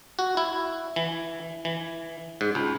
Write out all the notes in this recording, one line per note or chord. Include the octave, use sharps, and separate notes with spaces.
F#4
E4
E3
E3
G#2
C#2